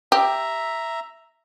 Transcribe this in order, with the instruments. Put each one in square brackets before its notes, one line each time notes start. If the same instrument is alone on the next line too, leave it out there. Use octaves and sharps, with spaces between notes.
[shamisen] G4 [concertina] E5 A#5